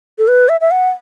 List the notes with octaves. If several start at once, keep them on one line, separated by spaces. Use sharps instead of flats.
A4
B4
E5
E5
F#5